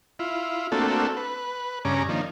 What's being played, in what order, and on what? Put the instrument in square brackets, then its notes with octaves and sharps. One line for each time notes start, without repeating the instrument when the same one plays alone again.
[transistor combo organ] E4 F4
A3 A#3 C4 D4 F#4 A4
B4
G2 C#3 C#4 A#5 D6
D#3 F3 A#3 D4